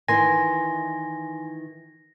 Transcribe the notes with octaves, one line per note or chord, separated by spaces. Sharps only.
D#3 E3 E4 G#5 C6 A#6